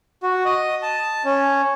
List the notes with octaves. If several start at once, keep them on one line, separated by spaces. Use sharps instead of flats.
F#4
D#5
A5
C#4